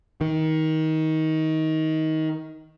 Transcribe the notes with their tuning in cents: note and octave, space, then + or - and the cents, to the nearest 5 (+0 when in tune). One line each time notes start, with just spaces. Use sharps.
D#3 +20